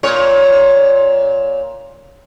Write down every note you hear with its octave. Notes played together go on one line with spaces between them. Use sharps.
A#2 C#5